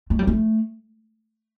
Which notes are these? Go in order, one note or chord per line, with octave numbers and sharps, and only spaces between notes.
A3
G3
A3